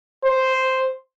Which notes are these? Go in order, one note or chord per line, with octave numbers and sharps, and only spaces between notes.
C5